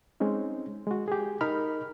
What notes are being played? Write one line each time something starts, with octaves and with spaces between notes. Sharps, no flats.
G#3 C4 C#4 D#4
G#3 F#4
G4 G#4
D#4 A#4 B5 F6